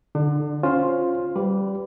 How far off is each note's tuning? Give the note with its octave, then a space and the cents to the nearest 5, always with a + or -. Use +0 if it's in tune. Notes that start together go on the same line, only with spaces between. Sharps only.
D3 +0 D4 +35
C#4 +0 F4 +10 C5 +0
G3 -15 B4 +20 D5 -10